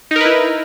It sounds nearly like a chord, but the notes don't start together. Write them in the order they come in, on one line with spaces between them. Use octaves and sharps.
D#4 A#4 B4 E4